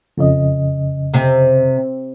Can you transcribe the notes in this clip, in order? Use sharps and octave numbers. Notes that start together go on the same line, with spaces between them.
F2 C#3 D#5
C3